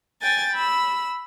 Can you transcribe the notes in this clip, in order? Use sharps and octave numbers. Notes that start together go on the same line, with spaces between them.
G5 G#5 A6
B5 E6